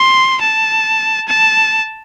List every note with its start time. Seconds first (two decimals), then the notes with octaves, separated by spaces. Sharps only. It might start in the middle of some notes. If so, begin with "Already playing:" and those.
Already playing: C6
0.41 A5
1.28 A5